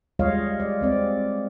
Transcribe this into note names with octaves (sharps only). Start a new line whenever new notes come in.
G3 G#3 F4 C#5 D#5 F5
D5
G#3 C4 D5